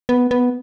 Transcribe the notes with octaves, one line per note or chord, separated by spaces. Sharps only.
B3
B3